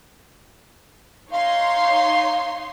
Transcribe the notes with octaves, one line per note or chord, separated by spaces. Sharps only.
D#4 C#5 F5 C6